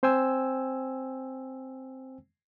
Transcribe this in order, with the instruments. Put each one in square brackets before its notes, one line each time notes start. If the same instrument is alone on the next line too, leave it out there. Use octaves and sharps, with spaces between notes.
[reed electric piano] C4 C5 G5 G#5 E6